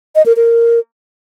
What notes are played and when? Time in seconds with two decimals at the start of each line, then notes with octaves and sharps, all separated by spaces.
0.15 D#5
0.26 A#4
0.36 A#4